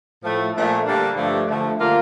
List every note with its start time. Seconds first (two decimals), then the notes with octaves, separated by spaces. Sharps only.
0.23 A2 F3 A3
0.54 A#2 F3 A3 D4
0.86 D3 G3 A#3 D4
1.17 G2 D3 F3 A3
1.48 D3 F3 A3
1.79 D3 G3 A#3 F4